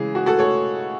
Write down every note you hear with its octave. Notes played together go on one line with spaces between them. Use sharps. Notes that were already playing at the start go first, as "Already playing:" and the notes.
Already playing: C#3 E3 G#3 G#4
F#4
F#4 A4
A4 C#5